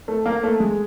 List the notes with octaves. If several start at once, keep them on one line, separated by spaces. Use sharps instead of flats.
A3
A#3
A3
G#3